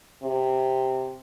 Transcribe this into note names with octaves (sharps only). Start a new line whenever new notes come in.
C3